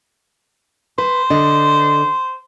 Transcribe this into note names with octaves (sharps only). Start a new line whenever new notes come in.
B4 C5
D3 D#5